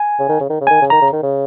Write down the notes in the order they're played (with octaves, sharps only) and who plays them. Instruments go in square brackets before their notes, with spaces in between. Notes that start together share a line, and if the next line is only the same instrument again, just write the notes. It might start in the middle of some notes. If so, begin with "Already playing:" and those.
Already playing: [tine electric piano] G#5
[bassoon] C#3
D#3
C#3
D#3
C#3
[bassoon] D#3 [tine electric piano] G#5
[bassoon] C#3
[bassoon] D#3 [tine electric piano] A#5
[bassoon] C#3
D#3
C#3